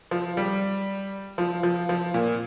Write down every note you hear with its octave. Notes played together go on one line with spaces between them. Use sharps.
F3
G3
F3
F3
F3
A#2